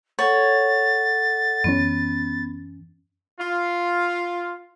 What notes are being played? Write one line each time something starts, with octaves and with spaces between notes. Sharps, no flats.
A4 C#5 F#5 A6
F#2 E3 B3 C#4
F4